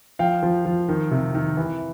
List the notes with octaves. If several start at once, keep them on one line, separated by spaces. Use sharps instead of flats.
F3 F5 G5
F3
F3
D#3
C3
D#3
E3